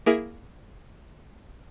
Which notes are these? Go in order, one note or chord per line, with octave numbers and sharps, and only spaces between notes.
A#3 E4 G#4 A#4 E5 E7